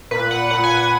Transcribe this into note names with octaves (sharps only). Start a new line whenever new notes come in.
A#2 B4
F#5
A#2 F#5
G#5
G#5